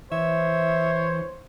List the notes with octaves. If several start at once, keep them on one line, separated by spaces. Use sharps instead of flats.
E3 C5 C#5 E5